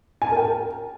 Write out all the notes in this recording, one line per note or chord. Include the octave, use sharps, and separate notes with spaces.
G#5
A5
A#4
G5
A#4